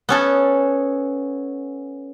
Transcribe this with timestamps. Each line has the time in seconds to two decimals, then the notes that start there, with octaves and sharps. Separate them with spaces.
0.09 B3 C#4 A4